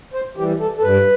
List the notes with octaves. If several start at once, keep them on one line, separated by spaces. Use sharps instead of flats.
C5
E3 G3 G4
A4
A4
G2 B4